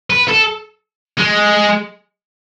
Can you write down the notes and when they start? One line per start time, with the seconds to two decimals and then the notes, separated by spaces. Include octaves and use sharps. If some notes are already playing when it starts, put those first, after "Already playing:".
0.10 B4
0.28 A4
1.18 G#3